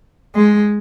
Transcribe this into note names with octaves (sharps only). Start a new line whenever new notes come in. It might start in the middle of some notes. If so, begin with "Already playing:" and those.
G#3